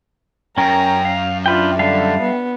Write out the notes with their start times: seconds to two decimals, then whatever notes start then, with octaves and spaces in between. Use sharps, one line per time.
0.58 F#2 C#4 A#4 G5 A#5
1.05 F5
1.46 D4 F4 B4 E5 G5
1.79 D3 G3 A4 F5
2.22 B3